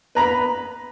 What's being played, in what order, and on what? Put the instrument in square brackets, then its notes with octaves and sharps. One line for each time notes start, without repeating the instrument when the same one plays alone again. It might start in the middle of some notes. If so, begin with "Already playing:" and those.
[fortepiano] B4 A#5 B5